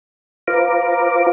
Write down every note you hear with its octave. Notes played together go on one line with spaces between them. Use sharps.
F4 B4 C5 F5 A#5 D6